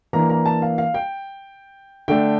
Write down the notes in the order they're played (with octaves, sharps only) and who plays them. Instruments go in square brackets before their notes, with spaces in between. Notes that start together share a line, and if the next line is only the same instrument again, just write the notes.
[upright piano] E3 A#3 D4 A#5
A#5
A5
F5
F5
G5
D3 A3 D4 G5